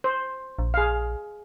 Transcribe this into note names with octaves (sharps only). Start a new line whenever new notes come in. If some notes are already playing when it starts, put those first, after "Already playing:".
C5
A#1
G#4 F5